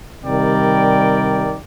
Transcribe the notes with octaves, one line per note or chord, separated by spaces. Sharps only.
C3 D#3 G3 A#4 D5 G5